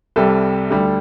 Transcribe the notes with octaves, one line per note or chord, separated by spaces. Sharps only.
C2 C3 G3 A4
D2 D3 G3